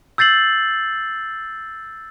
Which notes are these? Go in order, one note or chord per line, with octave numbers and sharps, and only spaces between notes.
E6 G6 A6 C7 F#7